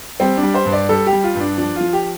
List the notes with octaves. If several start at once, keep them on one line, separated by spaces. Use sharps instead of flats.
G3 C4
D4
G3
C5
G2
D5
G3 A4
G4
G3
F4
G2
D4
F3 D4
F3 F4
G4